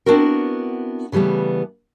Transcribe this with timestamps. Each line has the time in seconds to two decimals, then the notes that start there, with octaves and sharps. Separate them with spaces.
0.06 B3 C4 D4 E4 F#4 A#4
1.12 C#3 E3 G3 A3 B3